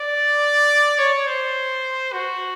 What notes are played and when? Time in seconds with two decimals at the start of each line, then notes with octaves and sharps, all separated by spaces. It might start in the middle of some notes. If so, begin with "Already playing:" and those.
Already playing: D5
0.99 C#5
1.27 C5
2.13 F#4